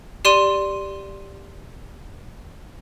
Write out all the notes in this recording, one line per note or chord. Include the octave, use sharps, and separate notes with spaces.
G4 D5 C6 D#7